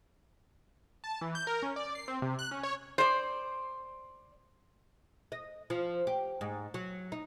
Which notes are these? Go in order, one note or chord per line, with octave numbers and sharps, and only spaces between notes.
A5
E3
G6
A#4
C#4
D5
C7
C4
C3
F#6
C#4
C#5
C5 D5
D#5
F3
G4
G#2
F#3
D#4